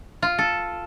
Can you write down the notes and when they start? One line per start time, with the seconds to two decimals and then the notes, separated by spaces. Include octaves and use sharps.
0.22 F4
0.38 A4